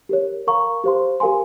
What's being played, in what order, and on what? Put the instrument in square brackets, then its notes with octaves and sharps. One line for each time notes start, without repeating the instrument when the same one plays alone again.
[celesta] G4 A#4 C#5
A#4 F5 A#5 C#6
G4 C5 F5 C6
G4 A#4 F5 G#5 C6